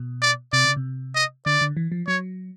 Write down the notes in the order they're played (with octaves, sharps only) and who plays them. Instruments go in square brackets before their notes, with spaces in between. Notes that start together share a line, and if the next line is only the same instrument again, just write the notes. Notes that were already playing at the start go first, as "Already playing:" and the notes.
Already playing: [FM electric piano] B2
[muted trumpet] D5
[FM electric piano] C3 [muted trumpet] D5
[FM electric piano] C#3
C3
[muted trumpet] D#5
[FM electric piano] D3 [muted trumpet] D5
[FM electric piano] D3
E3
F3
[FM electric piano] F#3 [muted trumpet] C#5